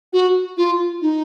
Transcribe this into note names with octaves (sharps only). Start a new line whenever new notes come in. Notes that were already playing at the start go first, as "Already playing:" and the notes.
F#4
F4
D#4